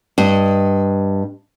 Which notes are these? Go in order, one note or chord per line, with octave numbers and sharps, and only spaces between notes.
G2 D#5